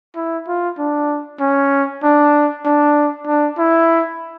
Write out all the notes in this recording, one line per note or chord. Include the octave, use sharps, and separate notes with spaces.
E4
F4
D4
C#4
D4
D4
D4
E4